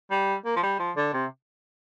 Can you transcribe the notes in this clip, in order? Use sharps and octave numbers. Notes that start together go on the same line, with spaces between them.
G3
A#3
F3
G3
F3
D3
C3